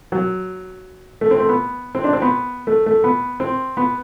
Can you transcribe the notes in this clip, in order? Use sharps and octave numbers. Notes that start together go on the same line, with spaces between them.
F#3
A3
C4
A3
B3
C4
D4
C4
B3
A3
A3
B3
C4
B3